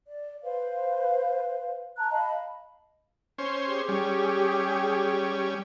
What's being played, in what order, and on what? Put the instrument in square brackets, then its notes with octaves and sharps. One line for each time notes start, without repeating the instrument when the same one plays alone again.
[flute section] D5
B4 C5 F5
A5 A#5 F#6
D#5 F5 A5 B5
[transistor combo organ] C#4 C5
[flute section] G4 G#4
[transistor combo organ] G3 C#4